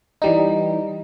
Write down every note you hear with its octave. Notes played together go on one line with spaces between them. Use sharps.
E3 G3 D#4